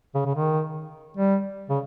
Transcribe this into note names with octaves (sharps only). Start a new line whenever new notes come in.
C#3
C#3
D#3
G3
C#3